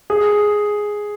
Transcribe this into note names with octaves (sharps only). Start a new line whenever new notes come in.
G#4